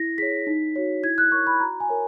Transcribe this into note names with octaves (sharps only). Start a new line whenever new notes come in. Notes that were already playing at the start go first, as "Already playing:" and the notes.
Already playing: E4 A#6
G#4 C#5 B6
D#4
F#4 C#5
E4 G#6
F#6
A#4 C#5 C#6
B5
F#4 A#5
G#5
A#4 C#5